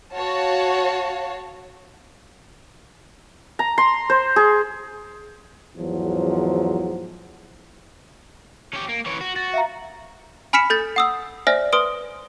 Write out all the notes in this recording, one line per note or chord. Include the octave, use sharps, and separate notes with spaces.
F#4 C#5 F5 A5
A#5
C6
C5
G#4
E2 G#2 F3 F#3
C#4 G4
A#3
E3 C#5
F#4
F#4 A6
E5 F5 A#5
G#5 B5 F6 B6 C#7 E7
A4 G6 A6
F#5 D#6 E6
C5 D5 E5 G#5 F6 A#6
B4 C6 D#6 D7